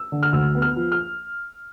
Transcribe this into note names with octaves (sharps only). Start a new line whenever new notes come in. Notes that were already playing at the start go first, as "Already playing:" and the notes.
Already playing: E6
D3
F6
D2 E6
B3
F6
F3
F6